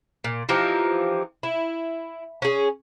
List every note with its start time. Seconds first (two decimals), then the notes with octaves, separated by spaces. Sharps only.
0.24 A#2
0.49 E3 F3 D#4 G4
1.43 E4
2.42 C#4 G#4